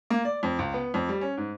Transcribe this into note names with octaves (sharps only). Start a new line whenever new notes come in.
A#3
D5
F2
C#2
B3
F2
G3
C#4
G#2